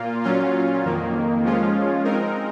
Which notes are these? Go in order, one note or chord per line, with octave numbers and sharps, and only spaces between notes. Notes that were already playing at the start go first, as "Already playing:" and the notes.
Already playing: A#2 A#3 F4
A#2 F#3 C#4 F4
F2 D#3 A#3
F3 G#3 C#4 F4
G#3 C4 D#4 A#4